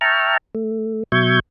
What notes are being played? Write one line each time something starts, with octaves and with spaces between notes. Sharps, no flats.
E5 G5 A5 A#5 C#6 F6
A3
B2 F#3 E5 C#6 G6 G#6